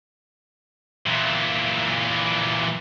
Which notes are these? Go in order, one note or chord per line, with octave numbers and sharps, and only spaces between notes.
A#2 E3